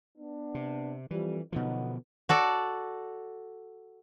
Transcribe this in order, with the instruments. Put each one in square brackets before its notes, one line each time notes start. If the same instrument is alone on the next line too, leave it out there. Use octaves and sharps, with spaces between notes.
[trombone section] B3 D4
[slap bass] C3
[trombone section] F2 G3 [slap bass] E3
[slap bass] B2 D3 F3 [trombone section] F#3 B3 D#4
[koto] F#4 A4 D5